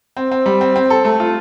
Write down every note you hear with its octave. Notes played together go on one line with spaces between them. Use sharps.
C4
C4
G3
C4
C4
A4
A3
F4